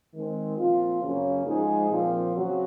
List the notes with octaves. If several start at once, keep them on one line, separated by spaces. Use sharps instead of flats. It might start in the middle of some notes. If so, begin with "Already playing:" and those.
D#3 G#3 C4
A#2 F3 C4 F4
F#2 C#3 F#3 A#3 C#4
G#2 F3 G#3 D#4 G#4
A#2 F3 C4
C#3 F#3 C4 F#4